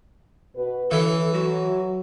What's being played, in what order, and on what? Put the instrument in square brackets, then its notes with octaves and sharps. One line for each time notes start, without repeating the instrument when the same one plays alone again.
[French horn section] B2 F#4 B4
[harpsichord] E3 [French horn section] C#4 E4 B4 [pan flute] A4
[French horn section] F#3 [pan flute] F#4